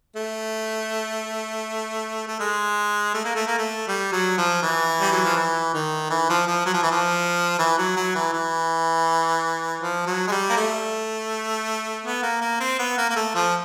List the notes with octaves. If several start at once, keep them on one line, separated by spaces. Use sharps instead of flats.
A3
A3
G#3
A3
A#3
A3
A#3
A3
G3
F#3
F3
E3
G3
F#3
F3
E3
D#3
E3
F3
F3
F#3
F3
E3
F3
E3
F#3
F#3
E3
E3
F3
F#3
G#3
G3
A#3
A3
B3
A#3
A#3
C4
B3
A#3
A#3
A3
F3